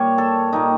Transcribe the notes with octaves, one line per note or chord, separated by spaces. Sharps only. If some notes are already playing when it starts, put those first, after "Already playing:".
Already playing: A#2 G3 C#5
A4
A#2 G3 D#4